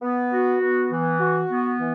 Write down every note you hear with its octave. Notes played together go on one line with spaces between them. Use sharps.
B3
F#4
B3
E3
F#4
B3
E3